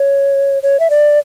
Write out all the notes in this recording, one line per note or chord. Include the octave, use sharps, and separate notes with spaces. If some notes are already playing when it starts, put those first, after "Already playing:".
Already playing: C#5
C#5
E5
D5